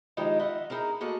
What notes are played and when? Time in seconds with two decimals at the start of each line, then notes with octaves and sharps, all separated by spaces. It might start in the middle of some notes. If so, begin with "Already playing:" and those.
0.17 D#3 F3 G3 G#3 D#4 E4
0.39 F4 D#5 E5 F#5
0.70 D#4 E4 G#4 A#4
1.01 A3 A#3 F#4 G#4 A4 D#5